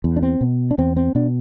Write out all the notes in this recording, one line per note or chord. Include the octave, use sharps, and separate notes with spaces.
E2
D4
C4
B2
D4
E2 C4
C4
B2 D4